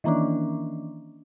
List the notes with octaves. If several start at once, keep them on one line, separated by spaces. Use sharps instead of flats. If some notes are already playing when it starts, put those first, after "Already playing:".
D#3 E3 A#3 C#4 D4